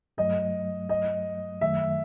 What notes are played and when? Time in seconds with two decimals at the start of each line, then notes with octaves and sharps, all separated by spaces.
0.18 G2 F#3 A3 D#5
0.89 D#5
1.61 F#2 D#3 F#3 A3 E5